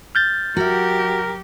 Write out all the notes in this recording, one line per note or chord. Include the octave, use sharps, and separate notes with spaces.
F6 G6 A6
F#3 F#4 G4 A#4 E5